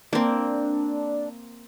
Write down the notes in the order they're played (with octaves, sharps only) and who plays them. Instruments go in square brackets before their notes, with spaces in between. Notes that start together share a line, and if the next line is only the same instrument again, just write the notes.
[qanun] A#3 C4 [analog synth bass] D4